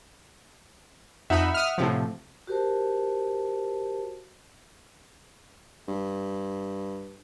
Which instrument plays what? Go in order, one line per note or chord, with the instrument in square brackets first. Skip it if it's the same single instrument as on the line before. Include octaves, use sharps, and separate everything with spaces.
[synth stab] F2 D#4 B5 [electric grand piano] E5 F#5
[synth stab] D#6 F6
A2 C3 F3
[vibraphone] F#4 G4 A#4 C5 A5
[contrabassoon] G2